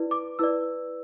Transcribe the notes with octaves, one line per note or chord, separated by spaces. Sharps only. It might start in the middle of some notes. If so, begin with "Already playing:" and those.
Already playing: E4 B4 D5
D6
E4 B4 D5 E6